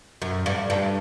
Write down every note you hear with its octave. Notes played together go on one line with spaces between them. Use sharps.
F#2
G2
G2